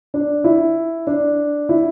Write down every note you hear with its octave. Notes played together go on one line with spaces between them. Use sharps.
D4
E4
D4
E4